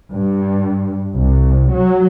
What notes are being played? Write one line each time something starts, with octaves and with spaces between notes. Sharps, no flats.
G2
C2
F#3